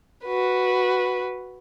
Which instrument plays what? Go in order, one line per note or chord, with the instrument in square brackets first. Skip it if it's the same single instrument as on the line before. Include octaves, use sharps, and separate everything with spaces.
[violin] F#4 B4